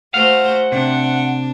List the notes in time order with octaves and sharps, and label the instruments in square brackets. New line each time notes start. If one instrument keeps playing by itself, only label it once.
[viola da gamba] A3 F#4 C5 [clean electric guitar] F5 [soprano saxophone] F#5
[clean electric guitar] C3 [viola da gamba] D4